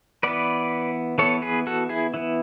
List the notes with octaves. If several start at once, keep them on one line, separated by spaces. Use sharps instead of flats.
E3 B3 B4 D5
E3 B3 A4 C#5
G#4 B4
F#4 A4
E4 G#4
E3 B3 E4